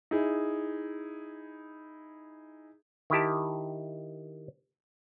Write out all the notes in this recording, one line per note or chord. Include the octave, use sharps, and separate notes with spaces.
D#4 E4 G#4
D#3 E4 G4 A5